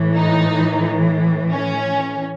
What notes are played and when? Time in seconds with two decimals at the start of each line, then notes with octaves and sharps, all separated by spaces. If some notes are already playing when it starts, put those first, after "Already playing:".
Already playing: A2 E3
0.16 D#4
1.51 C#4